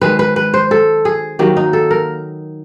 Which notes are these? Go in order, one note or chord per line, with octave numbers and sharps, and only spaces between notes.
D#3 G#3 B4
B4
B4
C5
A4
G#4
D#3 F#3 A#3 G4
D#4
A4
A#4